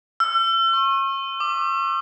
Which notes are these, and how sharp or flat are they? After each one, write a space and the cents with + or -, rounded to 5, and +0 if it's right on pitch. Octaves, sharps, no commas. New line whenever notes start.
E6 +40
C#6 -35
D6 +15